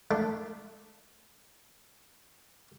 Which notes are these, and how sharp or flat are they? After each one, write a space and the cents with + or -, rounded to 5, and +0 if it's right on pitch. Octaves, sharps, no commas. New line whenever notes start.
A3 +0 D4 +10